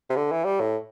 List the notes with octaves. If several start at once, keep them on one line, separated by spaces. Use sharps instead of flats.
C3
D3
E3
G3
A2